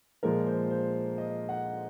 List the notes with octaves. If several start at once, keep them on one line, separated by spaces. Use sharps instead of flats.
A#2 F3 G#3 A#4
C5
C5
D#5
F#5